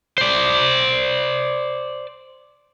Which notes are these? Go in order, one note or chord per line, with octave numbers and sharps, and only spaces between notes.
C5 D5